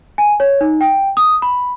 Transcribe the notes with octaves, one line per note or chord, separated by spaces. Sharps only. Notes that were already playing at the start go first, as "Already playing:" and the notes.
G#5
C#5
D#4
G5
D#6
B5